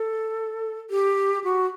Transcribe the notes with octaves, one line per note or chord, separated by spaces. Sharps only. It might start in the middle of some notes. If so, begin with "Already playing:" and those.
Already playing: A4
G4
F#4